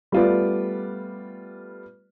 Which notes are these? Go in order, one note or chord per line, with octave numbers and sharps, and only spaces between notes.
G3 A3 B3 F4 B4 D5